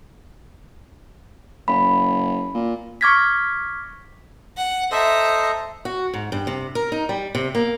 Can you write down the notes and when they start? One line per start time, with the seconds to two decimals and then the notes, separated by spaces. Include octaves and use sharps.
1.68 F#1 B5
2.55 A#2
3.01 C#6 D6 F6 G#6 A#6 B6
4.57 F#5
4.91 A4 C5 D#5 E5 A#5
5.85 F#4
6.14 G#2
6.32 G2
6.47 C3
6.75 A#4
6.92 D#4
7.09 G3
7.35 C3
7.55 A#3